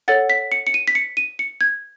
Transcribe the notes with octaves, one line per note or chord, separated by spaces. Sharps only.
A4 C#5 F#5 A6
B6
C#7
C#7
D#7
B6
C#7
D#7
C#7
G#6